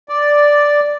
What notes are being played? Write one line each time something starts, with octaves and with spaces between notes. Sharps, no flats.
D5